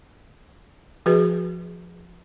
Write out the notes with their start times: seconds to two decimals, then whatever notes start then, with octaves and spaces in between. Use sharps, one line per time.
1.06 F3 F#4 G#4 B4